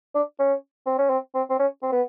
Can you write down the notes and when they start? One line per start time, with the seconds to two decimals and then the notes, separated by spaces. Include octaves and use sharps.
0.14 D4
0.39 C#4
0.86 C4
0.98 C#4
1.10 C4
1.35 C4
1.50 C4
1.59 C#4
1.83 C4
1.92 B3